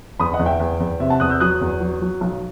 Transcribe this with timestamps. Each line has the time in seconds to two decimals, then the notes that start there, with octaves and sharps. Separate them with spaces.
0.19 E2 B5 D#6
0.33 D#5 F#5
0.39 E2
0.46 E5 G5
0.60 E2
0.80 E2
1.00 C3 E5
1.10 F#5 A5
1.20 E2 D#6 F#6
1.30 E6 G6
1.40 F#3 D#6 F#6
1.61 E2
1.80 F#3
2.01 F#3
2.21 B1